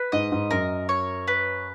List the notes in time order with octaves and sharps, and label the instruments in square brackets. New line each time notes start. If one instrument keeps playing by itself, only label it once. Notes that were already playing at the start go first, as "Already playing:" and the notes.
Already playing: [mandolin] B4
[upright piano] G#2 [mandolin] D#5
[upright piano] G#2
[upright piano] F#2 [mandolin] A#4
[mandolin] C#5
B4